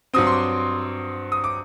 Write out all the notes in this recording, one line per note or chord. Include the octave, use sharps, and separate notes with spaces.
G2 F#3 C4 D#6
C6
D6
D#6
D6